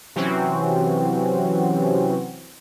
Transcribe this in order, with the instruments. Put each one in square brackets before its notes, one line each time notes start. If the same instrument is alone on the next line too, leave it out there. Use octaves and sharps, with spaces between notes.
[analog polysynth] C3 E3 F#3 C4 C#4 F#4